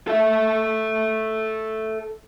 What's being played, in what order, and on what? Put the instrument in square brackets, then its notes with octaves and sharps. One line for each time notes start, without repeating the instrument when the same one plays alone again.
[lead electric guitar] A4 E5